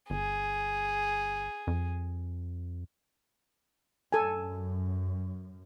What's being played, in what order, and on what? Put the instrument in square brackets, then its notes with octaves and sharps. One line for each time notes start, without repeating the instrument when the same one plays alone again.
[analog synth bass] G1 [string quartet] G#4
[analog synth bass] F2
[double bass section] F#2 [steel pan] A4 G#5